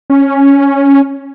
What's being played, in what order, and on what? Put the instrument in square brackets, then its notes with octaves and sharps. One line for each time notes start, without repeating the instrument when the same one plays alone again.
[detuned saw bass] C#4